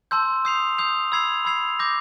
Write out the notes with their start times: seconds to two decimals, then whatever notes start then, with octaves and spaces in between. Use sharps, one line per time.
0.11 A5 C6 E6 G6
0.45 D#6 G6 C7 F7
0.78 D#6 G6 C7 F7
1.12 B5 E6 G#6 C7 F7
1.45 B5 E6 G#6 C7 F7
1.79 D6 G6 A#6